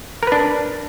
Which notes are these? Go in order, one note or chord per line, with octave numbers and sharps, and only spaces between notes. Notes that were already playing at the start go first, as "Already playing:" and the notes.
D4 A#4 B4